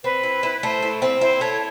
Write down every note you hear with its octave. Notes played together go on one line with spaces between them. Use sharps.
C4 B4
E4
E4
A3 C5
E4
C4
E4 C5
A3 C#5